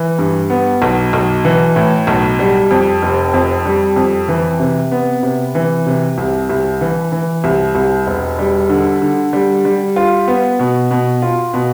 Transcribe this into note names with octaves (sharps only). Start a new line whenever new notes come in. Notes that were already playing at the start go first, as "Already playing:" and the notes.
Already playing: E3
G2
B3
B1
B1
E3
A2
B1
G3
F2
F1
F2
G3
F2
E3
C3
B3
C3
E3
C3
C2
C2
E3
E3
C2
C2
E1
G3
D3
D3
G3
G3
F4
B3
B2
B2
F4
B2